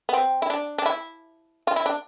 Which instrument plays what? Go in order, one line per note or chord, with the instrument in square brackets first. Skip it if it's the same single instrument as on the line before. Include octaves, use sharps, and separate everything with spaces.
[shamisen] B3
C4
E4
D4
D4
E4
F4
E4
D4